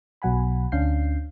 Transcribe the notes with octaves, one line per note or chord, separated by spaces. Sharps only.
B1 B2 F#3 F#5 G#5 B5
D2 C#4 D4 F5 G6 C7